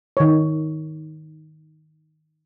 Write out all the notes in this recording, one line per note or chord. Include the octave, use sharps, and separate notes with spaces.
D#3 C#5